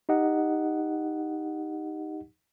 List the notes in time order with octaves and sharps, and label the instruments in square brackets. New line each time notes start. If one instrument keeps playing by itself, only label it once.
[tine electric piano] D#4 G4 D#5 F#5